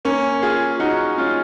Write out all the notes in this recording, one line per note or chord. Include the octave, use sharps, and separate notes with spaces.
A#3 C#4
F4 G#4
D#4 F#4
C#4 F4